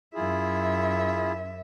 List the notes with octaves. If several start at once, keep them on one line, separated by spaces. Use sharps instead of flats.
F#2 E4 F4 G#4 E5